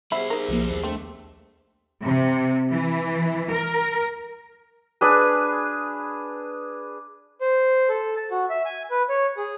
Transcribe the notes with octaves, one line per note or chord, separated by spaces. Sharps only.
F#3 G3 B3 G#4 C5 E5 B5
D#4 A#4
B1 F3 A#3
D#2
A3 C4 D4 D#5
C3
E3
A#4
D4 G#4 B4
C5
A4
A5
F#4
E5
G#5
B4
C#5
G#4